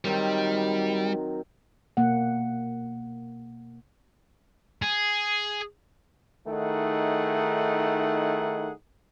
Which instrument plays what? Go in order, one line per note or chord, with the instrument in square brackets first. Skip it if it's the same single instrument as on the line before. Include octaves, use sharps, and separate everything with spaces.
[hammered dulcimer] D#3 F#3 C4 [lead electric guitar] G3
[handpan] B2 A#3 F#5
[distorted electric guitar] G#4
[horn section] D#3 A3 D#4 E4 G#4 F#5